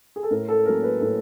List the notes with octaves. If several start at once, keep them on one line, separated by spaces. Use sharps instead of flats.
G#4
A4
A2 A#4
A4
F#3 A#3 C#4 A#4
B4
A2 A4